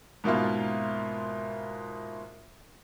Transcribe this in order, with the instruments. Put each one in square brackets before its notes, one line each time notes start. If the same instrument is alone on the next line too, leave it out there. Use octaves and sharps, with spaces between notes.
[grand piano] G#2 B2 A#3 E4 F4